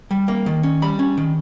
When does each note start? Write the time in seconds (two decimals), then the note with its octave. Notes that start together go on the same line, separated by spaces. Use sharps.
0.11 G3
0.28 A#3
0.46 D#3
0.63 C#4
0.82 G3 B5
0.99 C#4
1.17 D#3